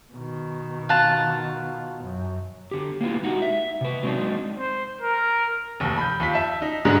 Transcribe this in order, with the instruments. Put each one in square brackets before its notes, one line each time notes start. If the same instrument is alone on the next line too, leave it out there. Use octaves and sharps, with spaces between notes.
[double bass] B2 D#3
[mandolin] F4 F#5 A5
[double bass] F#2
[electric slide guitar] D3 G4
A#3 B3 E4 F4
G#3 D#4 F#4 G4
E5
C3 B4
F#3 G#3 C4 D4 D#4
[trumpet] C5
A#4
[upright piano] F1 D#2
B5 G6
D#2 F4 B6
E5 A5
D#4
G#2 D3 G3 G#3 B3